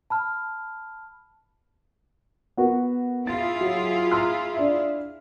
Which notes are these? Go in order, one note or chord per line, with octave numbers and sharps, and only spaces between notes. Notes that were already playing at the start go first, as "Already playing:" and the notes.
A5 B5 F6
B3 F#4 A#4
E4 F4 G#4 A6
F#3
A#5 C6 F6
D4 D5 E5